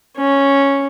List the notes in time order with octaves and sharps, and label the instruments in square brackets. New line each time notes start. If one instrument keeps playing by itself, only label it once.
[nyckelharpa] C#4